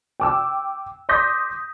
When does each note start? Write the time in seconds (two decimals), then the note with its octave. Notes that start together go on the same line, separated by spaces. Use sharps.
0.20 G5 D6 E6
1.09 C6 D6 D#6 G6 A#6 B6